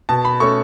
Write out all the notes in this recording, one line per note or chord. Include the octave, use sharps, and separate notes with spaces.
B2 A5
B5
A3 C#4 C#6